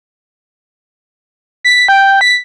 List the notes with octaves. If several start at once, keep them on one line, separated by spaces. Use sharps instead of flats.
B6
G5
B6